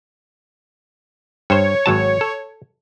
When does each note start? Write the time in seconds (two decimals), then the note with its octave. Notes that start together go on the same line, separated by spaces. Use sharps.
1.50 G2 C5 C#5
1.86 G#1 F#3 A5
2.21 A4